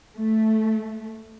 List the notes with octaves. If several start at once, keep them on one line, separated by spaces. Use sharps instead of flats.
A3